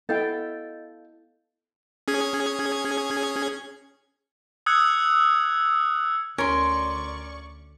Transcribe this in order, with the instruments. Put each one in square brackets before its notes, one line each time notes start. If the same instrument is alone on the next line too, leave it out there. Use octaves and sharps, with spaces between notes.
[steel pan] B3 E4 G5 [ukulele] A4 F5 [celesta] D#5 G6 A6
[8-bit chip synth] C#4 G#4 G#6
[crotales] D#6 E6 F#6 G#6 C#7
[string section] D2 D5 C#6 [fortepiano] C#4 [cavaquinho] A#4 C6